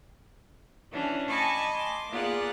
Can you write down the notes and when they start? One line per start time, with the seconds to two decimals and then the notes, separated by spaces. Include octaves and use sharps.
0.91 E3 C#4 D4 F#4 D5
1.28 D#5 G#5 A5 B5 C#6 D6
1.72 C6 D6
2.10 A#3 B3 F4 G#4 D5 F#5